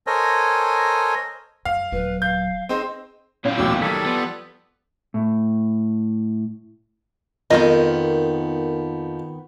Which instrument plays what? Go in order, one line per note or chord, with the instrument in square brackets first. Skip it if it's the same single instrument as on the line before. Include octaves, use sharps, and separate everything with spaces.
[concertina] A4 A#4 C5 C#5 D#5 G#5
[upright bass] F#2 [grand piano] F5
[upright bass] D#1 F#3 [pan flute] B4
[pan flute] F5 [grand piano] G6
[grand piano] C4 D#4 C5 [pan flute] G#4
[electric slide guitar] F#2 E4 F5 [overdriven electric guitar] A#2 C4 [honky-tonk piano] C#4
[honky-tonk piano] A1 D#2 B2 [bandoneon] G4 E6
[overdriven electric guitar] D#3 F#3 [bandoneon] G3 A4 D5 [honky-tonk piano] G#6 B6
[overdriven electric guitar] F3 [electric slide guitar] B3
[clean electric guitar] A2
[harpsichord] F2 [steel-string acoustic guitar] D#3 B3 [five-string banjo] F3 A#3 D#5 [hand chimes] A#4